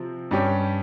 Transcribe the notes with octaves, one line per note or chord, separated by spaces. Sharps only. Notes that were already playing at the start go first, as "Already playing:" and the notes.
Already playing: C3 F3 C4
G2 G3 C#4 G4